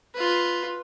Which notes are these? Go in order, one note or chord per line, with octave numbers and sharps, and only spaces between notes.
F4 B4